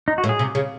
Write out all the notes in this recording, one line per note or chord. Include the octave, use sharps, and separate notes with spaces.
D#4
F#4
A2
G#4
C3
C#3